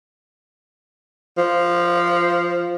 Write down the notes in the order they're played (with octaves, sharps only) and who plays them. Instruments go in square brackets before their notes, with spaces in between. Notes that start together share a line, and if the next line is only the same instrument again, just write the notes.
[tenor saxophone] F3